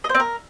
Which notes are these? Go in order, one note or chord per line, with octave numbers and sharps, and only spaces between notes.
D#5
C5
C4
A#4